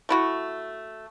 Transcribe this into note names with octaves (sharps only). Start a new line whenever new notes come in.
A3 E4 F#4